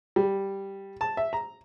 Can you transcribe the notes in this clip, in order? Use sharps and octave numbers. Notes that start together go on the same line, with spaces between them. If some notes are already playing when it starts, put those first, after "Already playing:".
G3
A5
E5
A#5